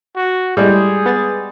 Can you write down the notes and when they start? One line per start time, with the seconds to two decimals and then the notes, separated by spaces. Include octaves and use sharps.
0.16 F#4
0.57 A2 G3 G#3 G#4
1.06 B3 A6